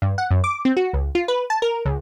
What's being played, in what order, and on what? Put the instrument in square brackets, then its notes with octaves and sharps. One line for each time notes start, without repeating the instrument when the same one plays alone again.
[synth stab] G2
F#5
F#2
D6
C4
F#4
C#2
F4
B4
A5
A#4
C#2